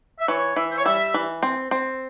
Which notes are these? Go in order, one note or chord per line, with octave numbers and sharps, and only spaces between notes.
E5
E3 C#5
E3 E5
C5
C#5
G3 E5
E3
C4
C4